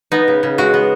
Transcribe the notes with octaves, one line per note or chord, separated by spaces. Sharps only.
B3 D#4
C#3
C#3
G#3 F#4
B3